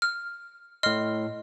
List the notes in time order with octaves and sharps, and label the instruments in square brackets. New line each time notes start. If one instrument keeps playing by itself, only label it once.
[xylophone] F6
[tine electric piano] A2 C6 [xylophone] D#5 F6